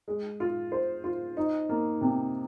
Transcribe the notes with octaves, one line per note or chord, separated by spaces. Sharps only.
G#3
F4
C5
F4
D#4
A#3
C3